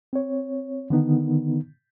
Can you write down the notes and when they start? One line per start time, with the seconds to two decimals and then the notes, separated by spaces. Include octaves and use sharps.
0.13 C4 C#5
0.90 D3 D#3 B3 D#4